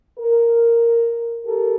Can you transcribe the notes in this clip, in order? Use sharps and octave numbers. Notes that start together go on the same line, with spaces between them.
A#4
G4 A4 A#4